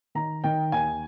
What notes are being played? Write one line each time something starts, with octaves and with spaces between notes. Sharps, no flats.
D#3 A#5
D#3 G5
D#2 G#5